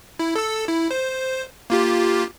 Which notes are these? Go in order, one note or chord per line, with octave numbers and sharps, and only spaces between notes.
E4
A4 E6
E4
C5
A#3 F4 G4